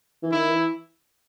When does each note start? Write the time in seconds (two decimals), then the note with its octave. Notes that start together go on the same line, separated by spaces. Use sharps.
0.23 E3
0.32 D#3 E4
0.50 E3